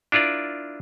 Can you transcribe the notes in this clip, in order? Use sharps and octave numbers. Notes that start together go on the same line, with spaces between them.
D4 E4 F4 A#4 D5